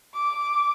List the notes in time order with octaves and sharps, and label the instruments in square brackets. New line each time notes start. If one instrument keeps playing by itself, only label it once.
[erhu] D6